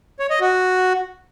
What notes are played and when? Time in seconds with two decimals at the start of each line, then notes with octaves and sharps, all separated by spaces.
0.20 C#5
0.30 D#5
0.41 F#4